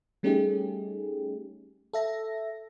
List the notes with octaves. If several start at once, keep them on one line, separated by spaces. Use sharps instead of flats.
G3 A3 C#4 D#4 G4 G#4
A4 E5 A#6